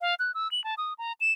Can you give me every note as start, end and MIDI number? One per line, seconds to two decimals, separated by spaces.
0.01 0.15 77
0.19 0.34 90
0.34 0.50 88
0.51 0.63 102
0.64 0.75 81
0.77 0.93 87
0.98 1.13 82
1.20 1.32 100